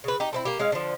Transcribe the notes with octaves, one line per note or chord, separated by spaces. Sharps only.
C#3 B4
D#4 G4
A3 C4 E4
A#3 G4
G#3 C#4 F5
D3 F3